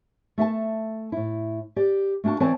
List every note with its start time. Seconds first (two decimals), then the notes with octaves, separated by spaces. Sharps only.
0.38 A3 E5 F#5 A5
1.12 A2 E4
1.76 G4 D5
2.24 A3 A#3 D4 F#4 A5
2.40 E3 C4 B4 C#5 D5 A5